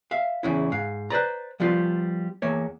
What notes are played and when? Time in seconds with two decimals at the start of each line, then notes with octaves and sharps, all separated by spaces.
0.11 E5 F5
0.43 E2 C#3 E4
0.72 G#2 F5
1.10 B4 C5 D5 A#5
1.60 F3 G3 B3 F4
2.42 E2 A#3 C#5